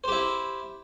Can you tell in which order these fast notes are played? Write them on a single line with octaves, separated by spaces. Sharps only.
C5 G4 E4